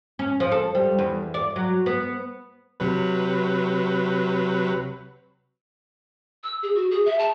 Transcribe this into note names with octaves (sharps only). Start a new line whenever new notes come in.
C#4
F3
A4
G3
E2
D5
F#3
B3
C3 F#3 B4
E6
G#4
F#4
G#4
E5
A5